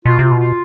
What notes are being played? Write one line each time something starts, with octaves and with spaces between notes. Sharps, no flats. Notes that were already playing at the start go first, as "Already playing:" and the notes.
B2 F4
C3 F4
B2
F4